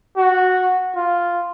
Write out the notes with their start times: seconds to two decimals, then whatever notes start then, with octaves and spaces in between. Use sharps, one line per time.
0.17 F#4
0.96 F4